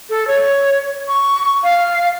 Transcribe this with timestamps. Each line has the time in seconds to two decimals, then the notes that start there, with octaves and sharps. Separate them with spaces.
0.10 A4
0.27 C#5
1.08 C#6
1.63 F5